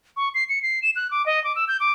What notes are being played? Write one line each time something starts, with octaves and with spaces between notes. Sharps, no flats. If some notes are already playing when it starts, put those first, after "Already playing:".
C#6
C7
C#7
C7
E7
F#6
D6
D#5
D6
E6
G6
D6